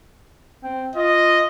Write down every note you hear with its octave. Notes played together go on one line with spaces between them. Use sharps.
C4
F4 D#5